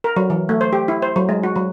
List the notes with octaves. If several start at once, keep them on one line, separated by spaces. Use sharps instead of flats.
A#4
F#3
E3
A3
C5
G4
E4
C5
F#3
G#3
F#4
F#3